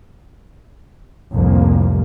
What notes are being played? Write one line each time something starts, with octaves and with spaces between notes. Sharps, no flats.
F1 C2 F2 A2 A#3